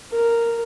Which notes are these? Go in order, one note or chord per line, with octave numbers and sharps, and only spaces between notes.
A#4